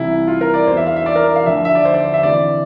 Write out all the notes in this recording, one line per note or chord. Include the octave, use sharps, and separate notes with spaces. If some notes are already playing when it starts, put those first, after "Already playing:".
Already playing: C2 C3 E3 E4
F4
A#4
D5
E2 E3 C5
E5
F5
E5
D5
A#4
F5
D2 D3 F3 E5
E5
D5
C5
D5
E5
D2 C3 E3 D5